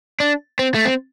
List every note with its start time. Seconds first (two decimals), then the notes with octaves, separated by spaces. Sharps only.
0.20 D4
0.59 C4
0.75 A3
0.85 C4